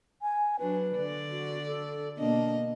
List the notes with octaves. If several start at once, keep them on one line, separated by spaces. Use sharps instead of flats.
G#5
F#3 D4 B4
D3 D5
F#4
A4
B2 A#3 D4 D#5